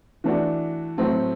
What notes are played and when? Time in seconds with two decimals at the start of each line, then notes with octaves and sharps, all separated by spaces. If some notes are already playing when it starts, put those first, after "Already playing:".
0.24 E3 A3 D4 F#4
0.98 A2 F#3 A3 C4